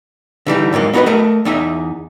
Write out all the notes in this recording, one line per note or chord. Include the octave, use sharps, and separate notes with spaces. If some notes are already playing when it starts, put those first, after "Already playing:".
D3 E3 G3 D#4
F2 G#2 F#3 A#3
B3 D#4 F#4 A4 B4 D#5
A3 A#4 D#5
E2 D#4 D#5 E5